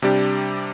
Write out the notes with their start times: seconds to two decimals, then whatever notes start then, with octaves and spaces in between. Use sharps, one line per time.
0.02 C3 G3 D4 G4